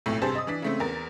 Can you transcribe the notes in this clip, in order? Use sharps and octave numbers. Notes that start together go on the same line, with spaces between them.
B1 F2 A2 A3
G2 C3 G#4 C5 A5 A6
D#5 D#6
E3 D4 B6
C#3 A3 C4
E2 A#4 A6